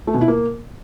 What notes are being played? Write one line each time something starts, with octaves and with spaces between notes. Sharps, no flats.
A3
B2
E4
A#3